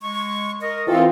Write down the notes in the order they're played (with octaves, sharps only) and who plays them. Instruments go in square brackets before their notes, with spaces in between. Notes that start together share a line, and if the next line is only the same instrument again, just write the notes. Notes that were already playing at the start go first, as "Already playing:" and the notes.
[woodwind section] G#3 C#6
A#4 D#5
[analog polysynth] E3 C4 F4 [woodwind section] A4